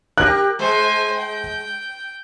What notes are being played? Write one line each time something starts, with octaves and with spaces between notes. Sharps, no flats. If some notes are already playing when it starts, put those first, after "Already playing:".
G4 A#4 F#6
G#3 C5 G#5
G5